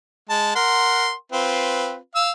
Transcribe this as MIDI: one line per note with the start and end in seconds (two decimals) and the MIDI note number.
0.29 0.52 56
0.29 0.52 81
0.55 1.12 70
0.55 1.12 78
0.55 1.12 84
1.32 1.96 60
1.32 1.96 65
1.32 1.96 71
2.15 2.31 77
2.15 2.31 88